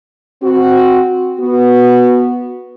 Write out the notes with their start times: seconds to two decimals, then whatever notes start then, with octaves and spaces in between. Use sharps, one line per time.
0.43 C4 F#4
1.40 B3 F#4